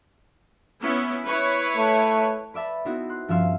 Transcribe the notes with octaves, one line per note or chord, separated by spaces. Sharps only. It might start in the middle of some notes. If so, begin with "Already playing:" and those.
B3 C#4 E4
E4 B4 C#5
A3
B4 D5 E5 A5 B5
B3 C4 D#4 E4 F#4
C6 F#6
G2 F3 C#4 E5 F5 C6